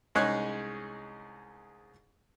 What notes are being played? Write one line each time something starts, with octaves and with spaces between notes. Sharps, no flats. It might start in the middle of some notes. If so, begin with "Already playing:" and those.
C2 G#3 C#4 D#4 G#4 F#6